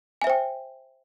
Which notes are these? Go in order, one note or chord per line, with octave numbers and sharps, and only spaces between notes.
C5 E5 G5 G#5